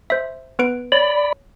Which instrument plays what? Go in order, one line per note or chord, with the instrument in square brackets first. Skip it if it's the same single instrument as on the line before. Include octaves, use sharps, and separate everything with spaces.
[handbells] C5 E5
B3 B4 D7
[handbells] C#5 [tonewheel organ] D5 B5